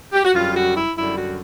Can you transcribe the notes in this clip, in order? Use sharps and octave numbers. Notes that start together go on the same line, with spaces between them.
G4
F#4
F#2 D3 G3 F4
F#4
E4
F#2 D3 G3 E4
F#4